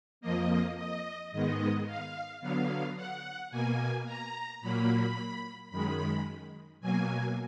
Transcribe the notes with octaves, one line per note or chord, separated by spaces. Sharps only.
F2 F3 A#3 D#5
D#5
G#2 D#3 G#3 B3 D#5
F5
D3 F#3 B3 F5
F#5
B2 A#3 G#5
A#5
A#2 F#3 A#3 B5
F#2 D#3 G#3 B5
B2 F#3 A#3 G#5